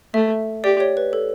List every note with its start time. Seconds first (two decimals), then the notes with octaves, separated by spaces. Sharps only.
0.14 A3 E5
0.64 G4 D5
0.80 C#5
0.97 B4
1.13 A4